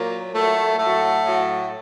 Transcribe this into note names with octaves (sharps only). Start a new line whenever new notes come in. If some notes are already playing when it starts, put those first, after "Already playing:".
Already playing: A#2 F#3 A#3
A#2 F#3 A3
A2 F#3 A3
A2 F#3